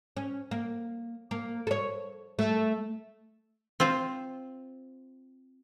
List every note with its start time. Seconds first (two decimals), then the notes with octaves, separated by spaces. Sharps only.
0.17 C#4
0.51 A#3
1.31 A#3
1.67 A4 C#5
2.39 A3
3.80 C4 F4 C5